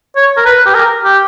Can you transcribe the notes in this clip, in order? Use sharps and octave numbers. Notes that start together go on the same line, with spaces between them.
C#5
A#4
B4
G4
A#4
G4